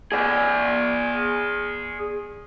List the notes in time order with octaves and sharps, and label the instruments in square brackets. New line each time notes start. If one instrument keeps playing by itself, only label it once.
[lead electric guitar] G#4 D5